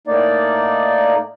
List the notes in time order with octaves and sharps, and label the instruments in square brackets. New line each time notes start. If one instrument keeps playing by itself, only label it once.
[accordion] A2 A#3 D#4 D5